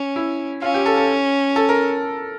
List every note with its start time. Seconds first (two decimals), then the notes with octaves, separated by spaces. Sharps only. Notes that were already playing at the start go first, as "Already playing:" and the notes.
Already playing: C#4
0.16 E4
0.62 C#4 F4
0.74 G4
0.86 A4
0.97 A4
1.56 A4
1.69 A#4